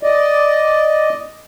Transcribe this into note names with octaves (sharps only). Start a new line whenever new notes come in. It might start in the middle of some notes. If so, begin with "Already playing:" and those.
D5 D#5